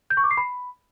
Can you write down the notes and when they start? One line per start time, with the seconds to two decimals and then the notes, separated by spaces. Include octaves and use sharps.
0.10 G6
0.17 C#6
0.24 D6
0.31 C7
0.37 B5